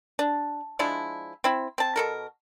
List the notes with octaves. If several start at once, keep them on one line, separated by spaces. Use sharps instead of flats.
D4
F3 G#3 D4 E4
C4 E4
C4 A5
B2 A4 A#4